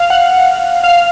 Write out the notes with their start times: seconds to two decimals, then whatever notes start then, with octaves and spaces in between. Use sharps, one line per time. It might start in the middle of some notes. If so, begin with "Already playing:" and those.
Already playing: F5
0.10 F#5
0.84 F5